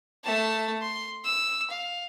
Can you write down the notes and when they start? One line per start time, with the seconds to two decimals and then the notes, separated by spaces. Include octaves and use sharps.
0.24 A3 A5
0.82 C6
1.25 E6
1.70 F5